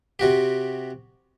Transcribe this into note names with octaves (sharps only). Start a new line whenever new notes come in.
C3 F#4 G4